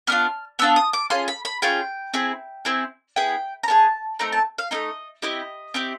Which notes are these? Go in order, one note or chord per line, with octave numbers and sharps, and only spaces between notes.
B3 D4 F4 F6
B3 D4 F4 E6
D#6
D6
C#4 F4 G#4 C6
B5
B5
C#4 F4 G#4 G5
C4 E4 G#4
C4 E4 G#4
B3 E4 G#4 G5
A#5
B3 E4 G#4 A5
A3 C4 D#4 A#5
A5
F5
A3 C4 D#4 D#5
C4 E4 G4 D#5
C4 E4 G4